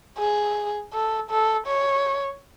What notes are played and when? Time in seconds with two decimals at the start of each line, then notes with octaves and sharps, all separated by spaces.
0.18 G#4
0.93 A4
1.30 A4
1.67 C#5